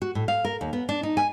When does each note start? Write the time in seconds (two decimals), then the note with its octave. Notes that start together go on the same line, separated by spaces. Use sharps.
0.02 F#4
0.15 A2
0.28 F5
0.45 A#4
0.61 D#2
0.73 B3
0.89 D4
1.03 D#4
1.17 G#5